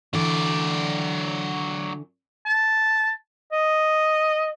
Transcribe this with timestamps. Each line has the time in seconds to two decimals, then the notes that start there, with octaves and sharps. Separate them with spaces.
0.13 D3 E3 F#3 D5
2.46 A5
3.52 D#5